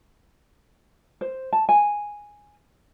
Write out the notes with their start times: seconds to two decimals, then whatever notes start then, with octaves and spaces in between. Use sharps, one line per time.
1.21 C5
1.53 A5
1.69 G#5